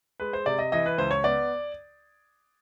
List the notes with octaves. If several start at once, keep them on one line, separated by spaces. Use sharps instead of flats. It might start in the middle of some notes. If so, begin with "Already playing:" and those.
G#3 B4
C5
C3 D5
D#5
E3 D#5
B4
C#2 C5
C#5
B3 D5